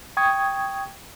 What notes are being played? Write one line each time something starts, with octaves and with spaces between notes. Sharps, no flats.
G5 C#6 D#6 G#6